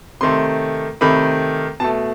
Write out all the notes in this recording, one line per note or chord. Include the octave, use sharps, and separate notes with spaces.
C3 D#3 A3 C6
C3 D#3 A3 B5
B2 A3 A5